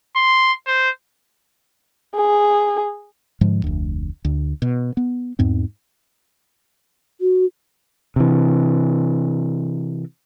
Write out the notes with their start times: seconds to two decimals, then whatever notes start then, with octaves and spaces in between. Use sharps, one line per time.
0.16 C6
0.67 C5
2.15 G#4
3.41 G#2 D3 F3 G#3
3.64 F1 D2
4.25 D2
4.62 B2
4.97 B3
5.39 E2 G#2 C4
7.21 F#4
8.16 C3 E3